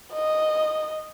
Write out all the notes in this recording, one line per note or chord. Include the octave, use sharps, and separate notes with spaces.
D#5